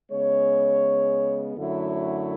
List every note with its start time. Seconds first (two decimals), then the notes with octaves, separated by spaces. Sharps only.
0.11 C#3 G#3 B3 C#5
1.56 F#2 D3 F#3 A3 E4